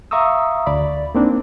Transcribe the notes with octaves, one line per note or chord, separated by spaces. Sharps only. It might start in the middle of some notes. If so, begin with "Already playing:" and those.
E5 F5 A#5 C#6 D#6 E6
D2 D5 B5
A#3 C4 D4 D#4